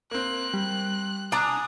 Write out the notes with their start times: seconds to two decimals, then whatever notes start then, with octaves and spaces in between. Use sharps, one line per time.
0.11 A#3 C4 F#6
0.54 G3
1.32 D4 G#5 A#5 D#6